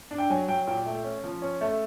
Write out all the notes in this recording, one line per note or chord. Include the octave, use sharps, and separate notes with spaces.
D4
G5
F#3 G#5
F#3 G5
A#2 G5
A3
C#4
F3
C#4
A3